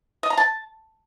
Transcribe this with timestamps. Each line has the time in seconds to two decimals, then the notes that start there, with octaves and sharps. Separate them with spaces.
0.23 D#5
0.30 A#5
0.37 A5